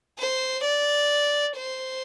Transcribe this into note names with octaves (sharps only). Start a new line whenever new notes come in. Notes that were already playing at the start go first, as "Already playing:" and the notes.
C5
D5
C5